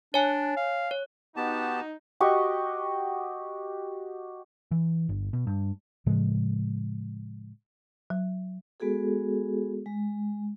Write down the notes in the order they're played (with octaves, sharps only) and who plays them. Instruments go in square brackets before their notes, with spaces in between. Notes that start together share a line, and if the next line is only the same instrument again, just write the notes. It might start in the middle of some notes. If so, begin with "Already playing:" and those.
[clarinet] D4 [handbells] C#5 G#5
[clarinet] F5
[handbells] C#5
[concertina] B3 G4 A5 [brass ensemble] D#4 [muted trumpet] F#4
[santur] F#4 G4 D#5 C#6
[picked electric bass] E3
G1
B2
G2
[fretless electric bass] A2 C#3 F3 G#3
[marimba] F#3
[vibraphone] G#3 B3 F#4 G#4 A4
G#3